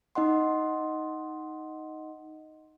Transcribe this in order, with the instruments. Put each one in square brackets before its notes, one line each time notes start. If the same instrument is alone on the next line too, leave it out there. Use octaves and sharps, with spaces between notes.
[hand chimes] D#4 D#5 F#5 C6